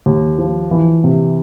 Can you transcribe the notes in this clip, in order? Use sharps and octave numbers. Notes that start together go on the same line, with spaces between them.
D#2
F3
E3
C3